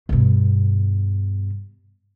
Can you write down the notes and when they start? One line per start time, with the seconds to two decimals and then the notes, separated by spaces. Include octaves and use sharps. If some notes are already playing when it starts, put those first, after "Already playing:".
0.09 G2 B2